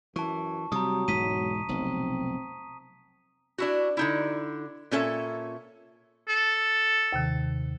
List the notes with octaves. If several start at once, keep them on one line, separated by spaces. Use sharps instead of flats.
F#2 E3 A5 C#6
C3 F#3 G3 A#5 D#6
E1 G#2 B6 D#7
F1 B1 C4
D4 E4 F#4
D3 D#4 E4
A#2 C#4 A4 E5
A4
D#2 C3 D#3